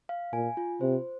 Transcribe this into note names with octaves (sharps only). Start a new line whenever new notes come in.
F5
A#2 G#5
F4
C3 C5